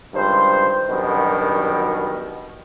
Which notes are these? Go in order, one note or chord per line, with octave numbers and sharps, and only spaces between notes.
C#2 G2 D#3 C5
F#2 B2 D3 D#3 G3